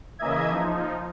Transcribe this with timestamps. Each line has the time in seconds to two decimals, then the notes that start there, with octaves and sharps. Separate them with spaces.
0.19 C#3 E3 A#3 D#5 E5 G#6
0.50 F3 D#4